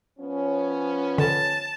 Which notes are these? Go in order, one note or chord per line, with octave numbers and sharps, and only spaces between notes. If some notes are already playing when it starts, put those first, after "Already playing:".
F3 B3 C#4
D3 A5